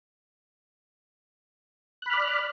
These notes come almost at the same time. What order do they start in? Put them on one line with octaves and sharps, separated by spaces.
F#6 B5 F6 D5